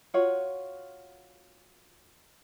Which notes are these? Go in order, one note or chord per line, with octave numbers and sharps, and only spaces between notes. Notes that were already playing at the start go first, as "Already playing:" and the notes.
F4 F#4 C#5 F#5